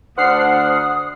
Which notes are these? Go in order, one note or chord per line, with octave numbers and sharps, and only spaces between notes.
D2 D4 C5 F#5 D#6 F6 C7